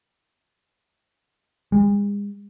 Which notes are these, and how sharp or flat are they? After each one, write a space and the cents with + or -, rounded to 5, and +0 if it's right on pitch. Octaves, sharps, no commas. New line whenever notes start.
G#3 -40